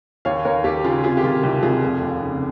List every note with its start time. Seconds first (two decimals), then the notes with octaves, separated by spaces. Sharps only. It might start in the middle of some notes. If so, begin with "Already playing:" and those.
0.25 D#2 C#5 F5
0.45 D#2 A#4 C#5
0.64 D#2 G4
0.84 C#3 F4 G#4
1.04 C3 F4 G#4
1.17 G4
1.23 D#3 F4
1.43 C2 G4
1.63 C2 F4 G#4
1.83 F1
2.01 D#2
2.21 C#3